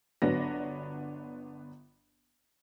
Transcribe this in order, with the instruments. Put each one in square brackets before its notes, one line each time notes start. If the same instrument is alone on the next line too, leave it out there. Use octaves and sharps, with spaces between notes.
[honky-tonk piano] G1 F#3 B3 D4 A#6